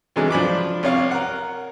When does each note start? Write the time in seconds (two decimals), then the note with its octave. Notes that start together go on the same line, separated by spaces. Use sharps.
0.16 G2 E3 F#3 G#3
0.31 F3 D4 B5 D6
0.83 C2 C#5 F5
1.11 A#4 F#5